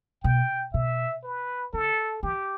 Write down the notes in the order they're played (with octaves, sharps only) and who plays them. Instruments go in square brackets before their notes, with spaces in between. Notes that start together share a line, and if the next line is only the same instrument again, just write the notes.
[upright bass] B2 [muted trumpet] G5
[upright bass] B2 [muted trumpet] E5
[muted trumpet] B4
[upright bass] D3 [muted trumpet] A4
[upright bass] E3 [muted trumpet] G4